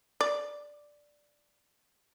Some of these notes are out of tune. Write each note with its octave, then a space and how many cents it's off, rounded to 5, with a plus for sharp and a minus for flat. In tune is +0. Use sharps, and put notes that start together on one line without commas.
D5 +0